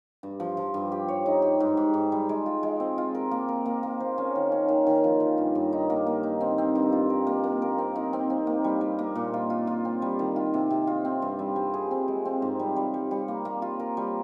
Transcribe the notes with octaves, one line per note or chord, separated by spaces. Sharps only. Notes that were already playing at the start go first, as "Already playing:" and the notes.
G2
F3
F3
G2
G4
C#5
D#4
G4
G#2
G#2
G#2
G3
G#3
F4
G#3
C4
F4
A#4
A#3
A#4
A#3
A#3
C5
C#4
D#3
C#4
D#3
D#3
F3
F3
G2
G2
D#4
A#3
A#3
D#4
C4
C4
G2
F4
A#4
A#3
A#3
A#4
C4
D#4
C4
C4
A#3
G3
G3
A#3
A#2
F4
F4
F4
C4
G3
D#3
F4
C3
C3
F4
C4
G2
G3
G3
G#4
C4
G#3
C4
G#2
G3
G3
G3
G3
A#3
A#3
F4
A#4
G3